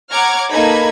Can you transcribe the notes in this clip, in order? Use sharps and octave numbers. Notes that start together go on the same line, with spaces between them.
C#5 F#5 A#5 D6 F6 G#6
A#3 D#4 A4 B4 B5 G#6